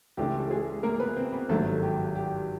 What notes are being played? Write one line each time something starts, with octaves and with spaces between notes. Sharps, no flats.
C#2 C#3 E3 A3 D4 G4
A4
G#3 G#4
A#3 A#4
B3 B4
C4 C5
B3 B4
G#1 G2 D#3 F#3 A3 A#3 A4
G4
G4